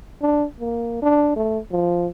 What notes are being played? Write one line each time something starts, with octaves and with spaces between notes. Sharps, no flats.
D4
A#3
D4
A3
F3